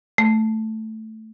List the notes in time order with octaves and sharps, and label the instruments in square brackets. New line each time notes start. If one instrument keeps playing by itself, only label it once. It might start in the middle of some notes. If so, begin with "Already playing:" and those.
[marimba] A3